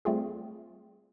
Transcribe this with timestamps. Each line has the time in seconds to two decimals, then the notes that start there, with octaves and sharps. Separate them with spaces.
0.05 G3 A3 C4 F4 G#4